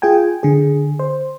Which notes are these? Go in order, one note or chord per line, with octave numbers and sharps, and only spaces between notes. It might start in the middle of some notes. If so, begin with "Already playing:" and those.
F4 G#4 G5 G#5
D3 G#4
C5